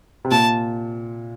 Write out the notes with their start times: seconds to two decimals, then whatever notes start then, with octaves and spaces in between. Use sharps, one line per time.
0.25 C3
0.31 A#2 A5